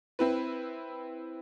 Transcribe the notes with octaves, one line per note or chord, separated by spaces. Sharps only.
C4 E4 B4